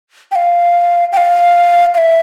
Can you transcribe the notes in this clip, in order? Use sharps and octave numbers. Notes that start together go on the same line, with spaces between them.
G5
F5
G5
F5
F5
E5